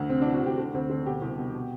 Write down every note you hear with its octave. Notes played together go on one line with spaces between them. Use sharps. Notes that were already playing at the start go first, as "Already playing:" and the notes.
Already playing: D2
C3 C4
E3 D4
F#4
D2 G4
D3
D2 C4
D3 C4
B2 G4
C2
B2
B2